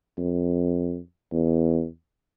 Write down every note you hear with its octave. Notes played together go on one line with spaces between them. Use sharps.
F2
E2